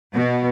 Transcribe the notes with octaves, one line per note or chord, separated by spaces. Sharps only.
B2